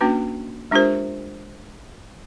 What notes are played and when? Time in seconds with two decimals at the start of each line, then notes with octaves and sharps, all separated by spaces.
0.01 A#3 C#4 D4 F#4 B4
0.71 G#3 D4 F4 G4 A#4 C5